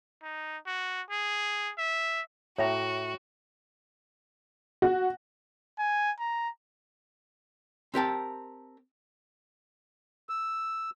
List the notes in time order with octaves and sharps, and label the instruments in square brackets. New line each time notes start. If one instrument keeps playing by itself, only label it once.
[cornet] D#4
F#4
G#4
E5
[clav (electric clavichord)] A2 A#5 [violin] F#4 [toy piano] C#5 E5 G5
[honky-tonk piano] F#4
[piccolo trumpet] G#5
A#5
[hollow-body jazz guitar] C4 G4 A#4 A5
[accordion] E6